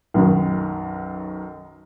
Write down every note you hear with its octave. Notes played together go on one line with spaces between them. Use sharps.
B1 F#2 D#3